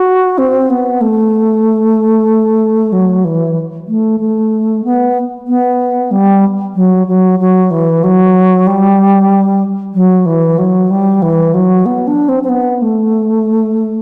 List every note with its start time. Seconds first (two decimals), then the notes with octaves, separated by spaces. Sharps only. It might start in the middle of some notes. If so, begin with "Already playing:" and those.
Already playing: F#4
0.38 C4
0.70 B3
1.01 A3
2.92 F#3
3.24 E3
3.88 A3
4.19 A3
4.84 B3
5.47 B3
6.11 G3
6.74 F#3
7.07 F#3
7.39 F#3
7.70 E3
8.03 F#3
8.67 G3
9.93 F#3
10.25 E3
10.58 F#3
10.90 G3
11.22 E3
11.53 F#3
11.85 B3
12.07 D4
12.28 C4
12.43 C4
12.48 B3
12.81 A3